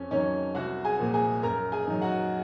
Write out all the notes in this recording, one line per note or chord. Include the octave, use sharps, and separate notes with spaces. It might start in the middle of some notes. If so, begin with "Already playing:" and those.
Already playing: F2 C#4 C#5
D#3 F#3 C#4 C#5
C2 F#4 F#5
G#4 G#5
A#2 F3
G#4 G#5
F#2 A#4 A#5
G#4 G#5
D#3 F#3
F#4 F#5